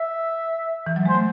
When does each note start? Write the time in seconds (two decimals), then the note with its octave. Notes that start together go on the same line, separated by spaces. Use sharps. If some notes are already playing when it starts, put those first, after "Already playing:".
Already playing: E5
0.87 E3
0.96 F#3
1.05 G#3 C5
1.15 A3